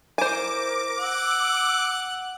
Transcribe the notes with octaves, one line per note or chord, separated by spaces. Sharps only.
E4 A#4 C5 G#5 D6
F#5 E6